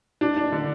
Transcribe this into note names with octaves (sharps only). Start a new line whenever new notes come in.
D4
D4
D3